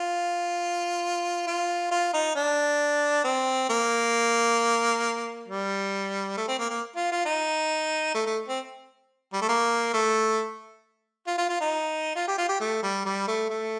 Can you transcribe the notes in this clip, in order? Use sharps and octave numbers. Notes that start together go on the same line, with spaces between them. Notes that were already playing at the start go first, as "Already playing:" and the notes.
Already playing: F4
F4
F4
D#4
D4
C4
A#3
G3
A3
C4
A#3
A#3
F4
F4
D#4
A3
A3
C4
G3
A3
A#3
A3
F4
F4
F4
D#4
F4
G4
F4
G4
A3
G3
G3
A3
A3